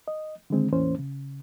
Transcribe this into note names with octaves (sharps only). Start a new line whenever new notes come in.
D#5
D3 D#3 G#3 C4
E2 A2 E3 A#3 C#4 C5
C#3